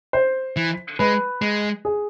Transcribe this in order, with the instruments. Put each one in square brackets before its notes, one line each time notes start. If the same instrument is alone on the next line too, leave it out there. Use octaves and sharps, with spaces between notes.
[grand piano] C5
[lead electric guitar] E3
[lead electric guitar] G#3 [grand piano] B4
[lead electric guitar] G#3
[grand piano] G#4